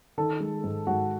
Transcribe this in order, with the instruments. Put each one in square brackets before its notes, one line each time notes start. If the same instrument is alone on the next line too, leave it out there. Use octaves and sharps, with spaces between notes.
[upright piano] D#3 A4
G#3
G#2
G#2 F#4